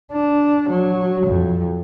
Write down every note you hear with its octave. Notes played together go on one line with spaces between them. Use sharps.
D4
F#3
F2